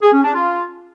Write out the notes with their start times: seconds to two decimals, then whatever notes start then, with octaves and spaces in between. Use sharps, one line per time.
0.02 G#4
0.13 C#4
0.23 D4
0.34 F4